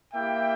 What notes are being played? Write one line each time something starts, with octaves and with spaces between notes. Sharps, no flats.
A#3 E4 G4 E5 G5